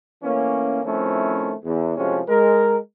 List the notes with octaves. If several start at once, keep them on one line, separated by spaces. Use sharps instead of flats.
E3 A3 A#3 C#4
D#3 F3 A3 C4 C#4 E4
E2
A2 C3 F3 G#3 C#4
G#3 A#4